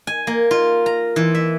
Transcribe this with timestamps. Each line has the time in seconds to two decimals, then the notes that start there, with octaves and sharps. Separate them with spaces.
0.07 G#5
0.27 A#3
0.51 F4
0.86 A#5
1.16 E3
1.35 E5